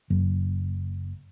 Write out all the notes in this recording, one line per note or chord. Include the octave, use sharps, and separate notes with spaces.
F#1